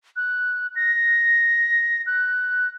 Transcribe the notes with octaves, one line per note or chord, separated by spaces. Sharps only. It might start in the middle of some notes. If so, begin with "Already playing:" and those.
F#6
A#6
F#6